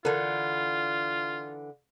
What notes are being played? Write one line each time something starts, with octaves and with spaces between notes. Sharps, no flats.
D3 E3 F4 A4 A#4